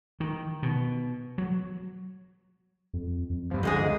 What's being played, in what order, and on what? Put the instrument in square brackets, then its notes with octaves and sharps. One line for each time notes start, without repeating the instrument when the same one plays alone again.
[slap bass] D#3
B2
F#3
[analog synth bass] F2
F2
[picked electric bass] G2 F3
[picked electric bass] C#2 F3 [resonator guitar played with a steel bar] G#2 G#3 G#4 [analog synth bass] D3